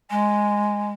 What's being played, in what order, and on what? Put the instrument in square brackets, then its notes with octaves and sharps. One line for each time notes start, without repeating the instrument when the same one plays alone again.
[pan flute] G#3 [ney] G#5